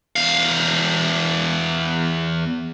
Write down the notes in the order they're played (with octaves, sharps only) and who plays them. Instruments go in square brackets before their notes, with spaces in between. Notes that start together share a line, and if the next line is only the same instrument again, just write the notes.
[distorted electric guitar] E2 F5